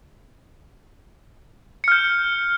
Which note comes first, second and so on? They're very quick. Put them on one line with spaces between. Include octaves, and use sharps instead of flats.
C#7 F6 G6